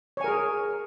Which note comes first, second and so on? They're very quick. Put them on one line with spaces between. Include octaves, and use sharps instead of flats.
C#5 G#5 A#4 G#4